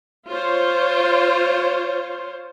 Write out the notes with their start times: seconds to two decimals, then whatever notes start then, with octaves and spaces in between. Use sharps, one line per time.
0.28 F4 C5 C#5